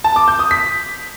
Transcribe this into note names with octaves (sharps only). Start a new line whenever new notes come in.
A5
D6
G6
D#6
B6